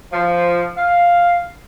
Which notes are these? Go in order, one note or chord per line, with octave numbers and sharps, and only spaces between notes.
F3
F5